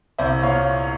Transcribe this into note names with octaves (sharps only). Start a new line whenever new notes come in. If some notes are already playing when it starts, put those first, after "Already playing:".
C2 C5 E5
A#2 C#5 F5